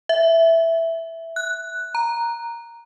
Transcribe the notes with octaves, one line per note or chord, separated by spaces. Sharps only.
E5
F#6
A#5